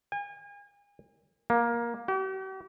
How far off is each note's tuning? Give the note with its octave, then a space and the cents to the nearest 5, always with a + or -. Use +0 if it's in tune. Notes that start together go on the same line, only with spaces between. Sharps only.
G#5 -40
A#3 +15
G4 -45